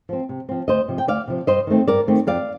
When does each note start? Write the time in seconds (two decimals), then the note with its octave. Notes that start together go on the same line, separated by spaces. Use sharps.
0.09 F3 C4
0.29 C3
0.49 F3 C4
0.68 D2 C5 D#5
0.88 C3 F3
0.98 G5
1.07 D2 D5 F5
1.27 C3 F3
1.47 G2 C5 D#5
1.67 D#3 A3 C4
1.87 G2 A#4 D5
2.07 D#3 A3 C4
2.27 F2 D5 F5